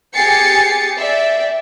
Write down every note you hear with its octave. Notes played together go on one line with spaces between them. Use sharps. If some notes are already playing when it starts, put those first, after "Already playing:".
G4 G#4 G#5 A6 C7 C#7
D5 E5 G5